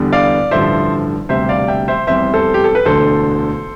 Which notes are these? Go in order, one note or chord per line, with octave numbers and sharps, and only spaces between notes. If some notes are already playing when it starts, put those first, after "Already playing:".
Already playing: E2 D3 G3 B3
D5 F5
A1 G2 D3 F3 C5 E5
E1 D2 C3 G3 C5 E5
D5 F5
E5 G5
C5 E5
F1 E2 C3 G3 C5 E5
A4 C5
G4
A4
B4
E1 D2 D3 A4 C5